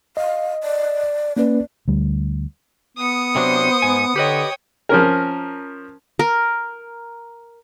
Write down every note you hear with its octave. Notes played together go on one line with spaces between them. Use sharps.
D#5 F5
D5
A#3 C#4 B4 D5
D2 G3
B3 D#6 C#7
C3 F#3 D4 C5
G#2 G#5
D3 G4 B4 C#5 D#5 G5
F3 C#4 A#4
A#4